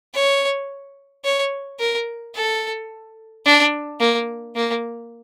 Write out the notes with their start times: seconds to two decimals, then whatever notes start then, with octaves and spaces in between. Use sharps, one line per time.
0.14 C#5
1.24 C#5
1.80 A#4
2.35 A4
3.45 D4
4.00 A#3
4.55 A#3